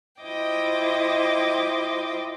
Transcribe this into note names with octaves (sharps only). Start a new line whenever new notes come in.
E4 F4 C5 D#5 G5 D6